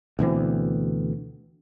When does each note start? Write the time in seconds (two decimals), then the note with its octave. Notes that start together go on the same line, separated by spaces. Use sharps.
0.19 D2 B2 E3 C4